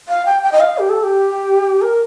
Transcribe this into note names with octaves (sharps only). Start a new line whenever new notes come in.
F5
G5
G5
D#5
F5
G4
A4
G4
A#4